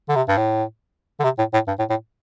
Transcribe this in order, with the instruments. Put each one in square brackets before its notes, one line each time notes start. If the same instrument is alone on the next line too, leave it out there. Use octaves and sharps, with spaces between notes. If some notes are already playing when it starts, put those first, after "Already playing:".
[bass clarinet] D3
C3
G2
A2
D3
C3
A2
A2
G2
A2
A2